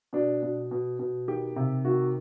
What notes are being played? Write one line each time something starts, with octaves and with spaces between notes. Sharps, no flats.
B2 D4
B2
B2
B2
D#3 G4
C3
D#3 F#4